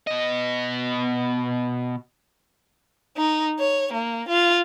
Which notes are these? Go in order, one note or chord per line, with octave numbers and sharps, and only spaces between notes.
B2 D#5
D#4
C#5
A#3
F4